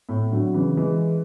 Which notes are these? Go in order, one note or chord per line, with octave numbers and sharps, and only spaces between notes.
A2
D3 F#3
C#3 E3
E3 G#3